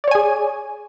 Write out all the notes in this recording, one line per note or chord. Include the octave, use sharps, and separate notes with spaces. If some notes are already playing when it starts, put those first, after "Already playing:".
G#4 C#5 D5 G#5